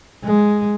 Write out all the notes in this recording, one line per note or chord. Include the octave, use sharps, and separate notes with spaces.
G#3